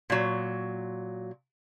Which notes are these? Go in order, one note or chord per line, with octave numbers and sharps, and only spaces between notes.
A#2 F#3